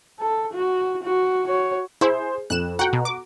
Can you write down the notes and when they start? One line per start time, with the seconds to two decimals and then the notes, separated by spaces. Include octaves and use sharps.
0.20 A4
0.53 F#4
1.03 F#4
1.47 F#4 C#5
2.01 E4 G#4 C5
2.50 F2 F#6 E7
2.79 F#4 F#5 G5 A#5
2.93 B2
3.05 D6